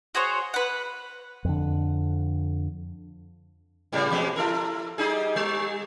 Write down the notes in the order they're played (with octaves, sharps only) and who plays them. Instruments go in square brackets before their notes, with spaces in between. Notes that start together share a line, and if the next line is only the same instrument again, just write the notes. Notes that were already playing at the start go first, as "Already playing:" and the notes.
[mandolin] F#4 G#4 C5 C#5
B4 F#5
[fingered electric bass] F2 D3
[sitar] G#2 C#3 G3
E2 B2 G#3
E4 A4 A#4
G3 D#4 G#4
G3